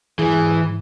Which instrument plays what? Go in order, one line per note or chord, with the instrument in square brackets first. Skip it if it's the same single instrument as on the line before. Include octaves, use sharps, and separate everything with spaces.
[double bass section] G#2 [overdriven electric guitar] E3 [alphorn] G#4